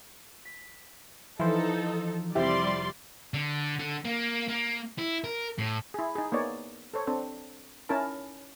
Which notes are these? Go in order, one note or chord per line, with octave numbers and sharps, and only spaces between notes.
B6
E3 F3 D#4 A4 C5
F1 G3 C4 E4 G4 D5 E5 C6
D3
D3
A#3
A#3
E4
A#4
A2
E4 G#4
D#4 G#4
A#3 B3 D#4 C#5 D5
A4 C5 C#5
C4 D4 A4
C#4 D#4 E4 A#4 A5